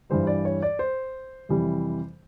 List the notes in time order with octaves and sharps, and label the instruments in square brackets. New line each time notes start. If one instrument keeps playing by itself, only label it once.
[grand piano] G2 E3 G3 C5
D5
C#5
D5
C5
F2 C3 E3 G3